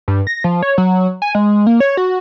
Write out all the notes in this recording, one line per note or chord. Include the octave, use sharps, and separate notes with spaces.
G2
A#6
F3
C#5
F#3
G#5
G#3
A#3
C#5
F#4